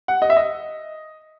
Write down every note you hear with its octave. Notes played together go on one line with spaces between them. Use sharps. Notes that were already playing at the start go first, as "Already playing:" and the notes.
F#5
D#5
E5
D#5